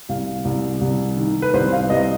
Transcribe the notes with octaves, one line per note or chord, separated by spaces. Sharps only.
C2 F5
C2
C2
D#3
B4
C2 C5
F5
C2 D#5